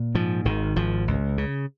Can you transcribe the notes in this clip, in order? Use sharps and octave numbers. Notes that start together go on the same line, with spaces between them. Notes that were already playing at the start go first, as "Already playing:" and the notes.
Already playing: A#2
G#2 F3
G#1 D#3
G#1 F3
C#2
C#3